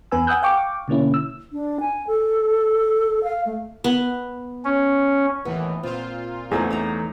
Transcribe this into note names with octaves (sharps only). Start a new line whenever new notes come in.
E2 B3 B4 G#5 E6
F#5 G#5 D#6 E6 F#6 G6
F5 G5 C#6 D6
B2 D3 A#3 C#4 E4
E6
D4
G#5
A4
F5
A3
B3
C#4
D#2 A2 E3 B3
A#2 C4 F4 F5
E2 E3 A3 B3 C4 D#4 G#4
D#4 C#5 A#5